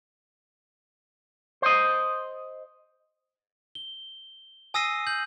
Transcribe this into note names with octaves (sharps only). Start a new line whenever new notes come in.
C5 D#5
G7
G#5 D#6 E6 A#6 C7 D#7
G6 F#7